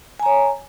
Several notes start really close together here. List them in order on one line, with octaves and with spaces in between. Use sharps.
G#5 A#5 C#5